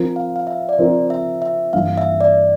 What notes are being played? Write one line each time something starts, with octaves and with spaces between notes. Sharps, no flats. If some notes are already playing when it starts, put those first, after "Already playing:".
Already playing: F3 C4 F4 A#4
F5
F5
E5
D5
F3 C4 F4 A#4 C5
E5
E5
G2 E3 A#3 F4 F5
E5
D5